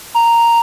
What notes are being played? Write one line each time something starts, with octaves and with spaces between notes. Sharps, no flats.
A#5